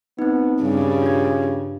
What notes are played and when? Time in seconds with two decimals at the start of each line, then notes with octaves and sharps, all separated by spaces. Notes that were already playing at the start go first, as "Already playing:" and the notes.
0.19 B3 C4 D#4
0.62 G2 C#3 G3
1.02 F4 G#6